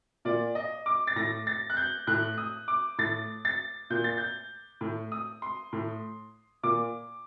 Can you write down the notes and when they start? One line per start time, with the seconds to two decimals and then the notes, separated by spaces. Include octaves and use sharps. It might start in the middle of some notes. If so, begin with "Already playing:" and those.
0.25 A#2 D5
0.55 D#5
0.86 D6
1.07 A6
1.16 A2 A#6
1.47 A6
1.70 F#6
1.77 G6
2.07 A2 F#6
2.38 D#6
2.68 D6
2.98 A2 A6
3.45 A6
3.90 A#2 G6
4.04 A6
4.18 G6
4.81 A2
5.12 D#6
5.42 C6
5.73 A2
6.63 A#2 D6